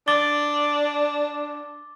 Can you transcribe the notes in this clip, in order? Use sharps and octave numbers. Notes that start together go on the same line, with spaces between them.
D4 D6 A6 G7